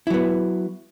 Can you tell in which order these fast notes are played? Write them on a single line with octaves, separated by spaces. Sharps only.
E4 F#3 B3